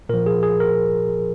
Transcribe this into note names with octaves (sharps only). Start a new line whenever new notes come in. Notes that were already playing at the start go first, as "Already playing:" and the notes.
A#2 F3 A#4
G#4
G#4
A#4